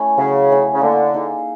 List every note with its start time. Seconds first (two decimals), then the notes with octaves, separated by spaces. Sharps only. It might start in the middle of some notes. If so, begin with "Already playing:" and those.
Already playing: A3 C#4 E4
0.18 C#3 F#3
0.50 A3 C#4 E4
0.74 C#3
0.81 D3 A#3
1.14 D#4 G#4